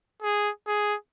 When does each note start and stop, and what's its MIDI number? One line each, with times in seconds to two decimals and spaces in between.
0.22 0.50 68
0.67 0.95 68